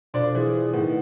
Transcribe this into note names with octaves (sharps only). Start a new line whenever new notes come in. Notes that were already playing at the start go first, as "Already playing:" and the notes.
B2 F3 D4 D5
E3 G#4
A2 D#3 B3